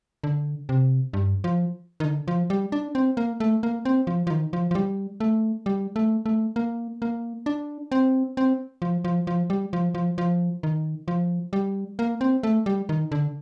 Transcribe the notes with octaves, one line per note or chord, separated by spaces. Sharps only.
D3
C3
G2
F3
D#3
D3
F3
G3
D4
C4
A#3
A3
A#3
C4
F3
F3
D#3
F3
F3
G3
A3
G3
A3
A3
A#3
A#3
D4
C4
C4
F3
F3
F3
G3
F3
F3
F3
D#3
F3
G3
A#3
C4
A3
G3
D#3
D3